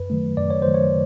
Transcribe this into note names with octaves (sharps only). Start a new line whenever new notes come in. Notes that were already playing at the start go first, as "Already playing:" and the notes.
Already playing: F#2 B4
D#3 F#3 A3
F#2 D5
C#5
D#3 F#3 A3 C5
C#5